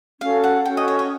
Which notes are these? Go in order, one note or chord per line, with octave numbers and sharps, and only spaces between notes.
C#4 F#4 A4 F5
F#5
C#4 F#4 A4 G5
D#5
C#5
C#5